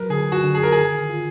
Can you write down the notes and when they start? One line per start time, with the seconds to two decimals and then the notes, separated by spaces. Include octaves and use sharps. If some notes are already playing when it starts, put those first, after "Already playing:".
Already playing: F#3 A#4 B4
0.10 D3 G#4
0.32 F#4
0.43 D3
0.55 G#4
0.63 A#4
0.72 D#3 G#4
1.09 F4